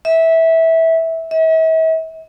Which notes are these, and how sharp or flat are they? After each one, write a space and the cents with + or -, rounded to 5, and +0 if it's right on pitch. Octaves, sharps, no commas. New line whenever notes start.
E5 -15
E5 -40